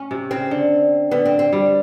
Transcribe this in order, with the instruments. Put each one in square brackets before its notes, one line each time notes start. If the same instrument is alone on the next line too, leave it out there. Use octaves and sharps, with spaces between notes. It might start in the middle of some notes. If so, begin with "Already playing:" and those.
Already playing: [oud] C#4
[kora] C3
[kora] C#3 [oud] C4
[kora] D3
[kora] D3 [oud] B3
[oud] C4
C4
[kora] G3